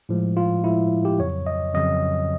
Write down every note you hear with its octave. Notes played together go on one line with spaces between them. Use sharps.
A2 F3 G#3
F4
A2 F3 G#3 E4
G4
F2 C#3 F#3 C#5
D#5
F2 C#3 F#3 D#5